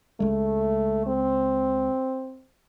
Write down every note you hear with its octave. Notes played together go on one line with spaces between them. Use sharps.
C#2 G#3 A3
C4